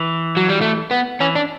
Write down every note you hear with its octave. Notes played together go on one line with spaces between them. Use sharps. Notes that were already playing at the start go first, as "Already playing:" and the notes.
Already playing: E3
F#3
G3
A3
B3
E3 C#4
D4